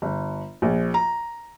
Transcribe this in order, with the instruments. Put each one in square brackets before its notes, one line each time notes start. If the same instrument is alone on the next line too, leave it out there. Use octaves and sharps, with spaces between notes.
[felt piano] G1
A#1
A#5